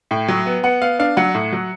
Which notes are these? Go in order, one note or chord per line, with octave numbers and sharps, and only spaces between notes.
A2 G5
F#3
B3
B3 F#5
B3 F5
D4 F5
F#3 F#5
A2
F#3